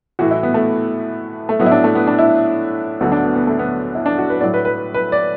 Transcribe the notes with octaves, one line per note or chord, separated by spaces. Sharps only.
A2 E3 F#4
E4
B3
A3
A3
A2 F#3 B3
E4
D4
A3
B3
D4
E4
D2 D3 F#3 B3
D4
B3
B3
A3
B3
E4
D4
F#4
B4
A2 F#3 D5
B4
B4
B4
D5